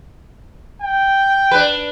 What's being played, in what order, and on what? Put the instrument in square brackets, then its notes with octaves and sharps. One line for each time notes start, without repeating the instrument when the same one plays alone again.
[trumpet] G5
[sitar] D4 B4